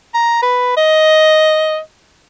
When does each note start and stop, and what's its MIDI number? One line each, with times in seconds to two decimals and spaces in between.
0.14 0.38 82
0.42 0.74 71
0.77 1.79 75